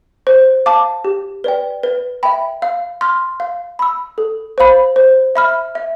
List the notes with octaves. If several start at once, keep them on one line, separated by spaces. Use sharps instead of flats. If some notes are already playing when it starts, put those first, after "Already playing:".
C5
F5 A5 D6
G4
B4 D5 G5
B4
E5 G5 B5
F5
C6 F6
F5
B5 E6
A4
C5 F5 B5
C5
E5 B5 F6
E5